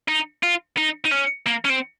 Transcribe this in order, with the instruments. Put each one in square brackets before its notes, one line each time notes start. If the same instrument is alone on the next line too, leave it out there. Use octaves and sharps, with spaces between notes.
[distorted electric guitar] D#4
F4
D#4
D#4
C#4
A#3
C#4
C4